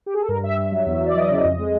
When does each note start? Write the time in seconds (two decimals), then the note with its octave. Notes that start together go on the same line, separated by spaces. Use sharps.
0.06 G4
0.14 G#4
0.21 A4
0.28 G2 A#4
0.43 G2 E5
0.57 G2 E5
0.72 F#3
0.86 E2
1.01 E2 D5
1.15 E3 D#5
1.30 C#3
1.44 F2
1.59 G#3